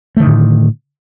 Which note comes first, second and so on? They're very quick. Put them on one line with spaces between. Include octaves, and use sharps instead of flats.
A3 D#3 D3 A2